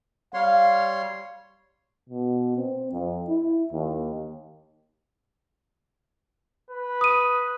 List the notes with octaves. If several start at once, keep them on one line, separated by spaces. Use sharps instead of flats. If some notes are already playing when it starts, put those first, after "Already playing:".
G3 C#5 F5 C6
B2
C4
F2
E4
D#2
B4
D#6 D#7